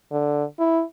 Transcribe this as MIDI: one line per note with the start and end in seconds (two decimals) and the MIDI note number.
0.12 0.44 50
0.59 0.82 64